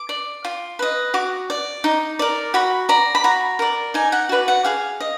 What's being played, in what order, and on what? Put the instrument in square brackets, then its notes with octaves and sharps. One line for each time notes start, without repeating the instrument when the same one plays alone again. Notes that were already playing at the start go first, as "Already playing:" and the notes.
Already playing: [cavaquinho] D6
D5
F4
B4 D#5
F#4 D6
D5
D#4
A#4 D5
F#4 B5
D5 A#5
B5
F#4 A#5
A#4 D5
D#4 G#5
F#5
F#4 B4 D5
F#5
G#4 F5
D#5